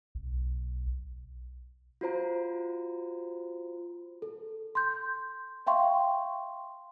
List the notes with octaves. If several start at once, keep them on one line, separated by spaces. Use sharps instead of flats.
B1
F4 F#4 C5 A#5
A4
C6 G6
E5 F5 G5 C6 C#6